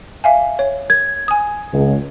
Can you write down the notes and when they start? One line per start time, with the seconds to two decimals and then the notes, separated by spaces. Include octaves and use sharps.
0.24 E5 F5 G#5
0.59 C#5
0.90 G#6
1.28 G#5 D#6
1.72 C#2